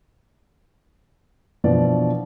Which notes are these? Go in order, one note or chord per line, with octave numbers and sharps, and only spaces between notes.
B2 E3 F3 D4 D5